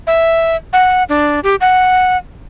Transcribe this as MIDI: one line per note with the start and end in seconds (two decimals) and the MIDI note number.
0.07 0.56 76
0.73 1.03 78
1.09 1.40 62
1.43 1.55 67
1.61 2.17 78